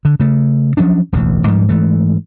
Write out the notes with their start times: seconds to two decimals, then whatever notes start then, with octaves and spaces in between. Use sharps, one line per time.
0.05 D3
0.20 C#3 A3
0.77 F3 F#3 C#4 D4
1.13 E1 A1 D2 E3
1.47 G#2 F3 G3
1.69 G#2 E3 A3